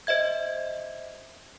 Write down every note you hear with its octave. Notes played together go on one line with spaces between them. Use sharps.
C5 D#5 E5 G#6